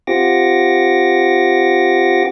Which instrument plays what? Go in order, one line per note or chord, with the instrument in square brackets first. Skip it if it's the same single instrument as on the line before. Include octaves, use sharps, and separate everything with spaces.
[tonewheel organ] C4 F4 G4 F#5 D6 A#6